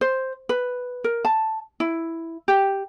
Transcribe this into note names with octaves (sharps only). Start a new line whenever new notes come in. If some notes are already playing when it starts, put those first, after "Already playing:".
C5
B4
A#4
A5
E4
G4